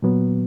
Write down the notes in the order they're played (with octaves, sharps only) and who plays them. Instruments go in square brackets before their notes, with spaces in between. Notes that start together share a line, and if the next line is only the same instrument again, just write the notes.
[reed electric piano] A#2 F#3 B3